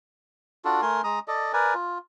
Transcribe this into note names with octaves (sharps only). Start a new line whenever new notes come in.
D4 F4 F#4 A4
A3 A#4 G#5 C6
G#3 A#5 D#6
A4 D5 D#5
A#4 B4 D5 G#5
F4